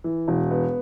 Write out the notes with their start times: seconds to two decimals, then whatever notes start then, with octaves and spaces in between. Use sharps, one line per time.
0.04 E3
0.28 E1
0.51 B3